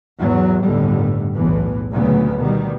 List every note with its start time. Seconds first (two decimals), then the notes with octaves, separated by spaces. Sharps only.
0.18 E2 G#2 F#3
0.63 G1 D#2 A2 D3 G3
1.34 B1 E2 A2 E3
1.91 D2 A#2 C#3 F#3 B3
2.38 B2 D#3 G3